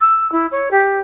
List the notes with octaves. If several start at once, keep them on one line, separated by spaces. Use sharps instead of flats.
E6
E4
C#5
G4